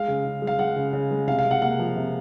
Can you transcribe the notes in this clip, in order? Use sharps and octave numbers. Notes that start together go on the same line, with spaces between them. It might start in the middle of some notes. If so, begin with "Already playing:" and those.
Already playing: G#3 F5
C#3
C#3
G#3
F5
G#3 F#5
C#3
C#3
G#3
C3 F5
F5
C3
F#5
A#3 F#5
F3
C3